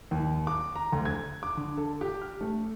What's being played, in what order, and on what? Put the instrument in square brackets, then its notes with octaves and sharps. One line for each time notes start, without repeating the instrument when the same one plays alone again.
[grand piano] D#2
D6
A#5
D2
G#6
D6
D3
A4
G4
F6
A3